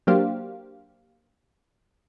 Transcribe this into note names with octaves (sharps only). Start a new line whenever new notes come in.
F#3 A#3 D4 G4 C5 F5